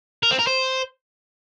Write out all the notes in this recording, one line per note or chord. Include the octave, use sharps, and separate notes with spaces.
A#4
C4
A#4
C5